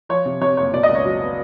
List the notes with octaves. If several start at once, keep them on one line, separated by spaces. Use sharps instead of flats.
F3 C#5
C3
C3 C#5
F#1 C#5
B2 D5
D#5
C#2
C#5
F#3
B3